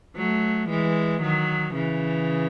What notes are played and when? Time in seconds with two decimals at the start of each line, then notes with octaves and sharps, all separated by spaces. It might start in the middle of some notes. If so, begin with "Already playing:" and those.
0.17 F#3 A3
0.69 E3 G#3
1.22 D#3 F#3
1.74 C#3 E3